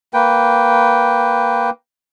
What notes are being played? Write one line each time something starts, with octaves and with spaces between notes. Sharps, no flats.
A#3 B4 G5